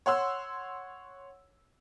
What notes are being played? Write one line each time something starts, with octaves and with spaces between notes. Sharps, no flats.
C#5 F#5 C6 E6